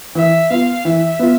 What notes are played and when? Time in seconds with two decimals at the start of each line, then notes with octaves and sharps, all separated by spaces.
0.15 E3 E5
0.50 B3 F4 F5
0.85 E3 E5
1.19 B3 F4